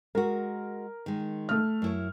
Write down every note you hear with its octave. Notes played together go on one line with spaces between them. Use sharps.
G#3 F#4 A#4
D#3 G#3
A3 F6
F#2 E4 C#5